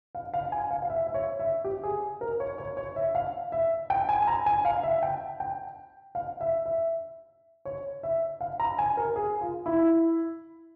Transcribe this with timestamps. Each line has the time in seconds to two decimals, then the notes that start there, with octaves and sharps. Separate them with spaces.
0.15 F5
0.34 F5
0.52 G#5
0.71 F5
0.82 F5
0.90 E5
1.07 E5
1.14 C#5
1.39 E5
1.64 G4
1.83 G#4
2.21 A#4
2.40 C#5
2.58 C#5
2.77 C#5
2.96 E5
3.15 F5
3.52 E5
3.90 G5
4.09 G#5
4.22 G#5
4.27 A#5
4.46 G#5
4.65 F5
4.83 E5
5.03 G5
5.40 G5
6.15 F5
6.41 E5
6.66 E5
7.65 C#5
8.03 E5
8.41 F5
8.60 A#5
8.78 G#5
8.97 A#4
9.16 G#4
9.41 F4
9.66 E4